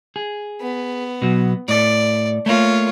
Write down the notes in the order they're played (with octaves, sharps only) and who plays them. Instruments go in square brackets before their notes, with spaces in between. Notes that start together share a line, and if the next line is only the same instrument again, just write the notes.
[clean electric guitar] G#4
[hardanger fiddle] B3
[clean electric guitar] B2 F#3
[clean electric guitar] A2 A4 [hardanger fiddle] D5
[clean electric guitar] A3 A#3 [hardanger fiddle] F4 C#5